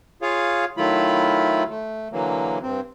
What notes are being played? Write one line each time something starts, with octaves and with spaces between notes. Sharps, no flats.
F4 G#4 C#5 F5
D#3 F#3 A3 E4 F4 B5
A3
D3 E3 F#3 A#3
G2 C4